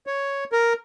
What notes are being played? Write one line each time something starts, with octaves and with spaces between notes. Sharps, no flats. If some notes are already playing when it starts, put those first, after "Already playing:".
C#5
A#4